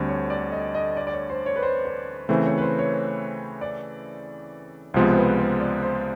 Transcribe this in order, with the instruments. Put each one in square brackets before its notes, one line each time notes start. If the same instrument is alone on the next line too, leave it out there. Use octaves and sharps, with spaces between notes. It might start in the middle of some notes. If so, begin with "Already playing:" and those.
Already playing: [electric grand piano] D2 D3 G3 C4 [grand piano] C5
[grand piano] C#5
D5
D#5
D#5
D5
D5
C#5
C5
C#5
B4
C5
C5
[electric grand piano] C#3 E3 A3 C4 [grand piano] C5
[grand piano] C#5
B4
C5
C#5
D5
[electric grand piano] C#2 C3 F3 G#3 B3 [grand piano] C5
[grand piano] C5
B4
C5
D5
C5